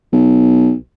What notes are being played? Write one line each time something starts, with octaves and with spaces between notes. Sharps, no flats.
B1